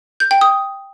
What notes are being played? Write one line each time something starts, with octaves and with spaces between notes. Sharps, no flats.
G6
G5
D#6